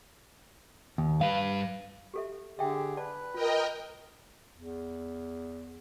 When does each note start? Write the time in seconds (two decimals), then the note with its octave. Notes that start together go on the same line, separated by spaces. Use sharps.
0.98 D#2
1.21 G2 B4 F5
2.14 G4 A4 E5
2.59 D3 G4 G#4 E5 G5
2.97 B4 D5 A5
3.34 F4 A#4 D#5 G5
4.56 E2